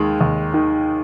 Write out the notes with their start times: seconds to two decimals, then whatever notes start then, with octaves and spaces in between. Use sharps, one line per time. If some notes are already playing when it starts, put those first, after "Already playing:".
Already playing: D#2 D#3 G#3
0.21 D#2
0.54 D#3